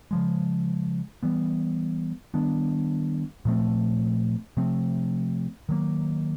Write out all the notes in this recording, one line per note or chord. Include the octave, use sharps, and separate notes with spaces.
C#3 F3 G#3
E3 G3 B3
D#3 G3 B3 D4
A#2 F3 A3 C4
C3 F3 A3 C4
D#3 F#3 A#3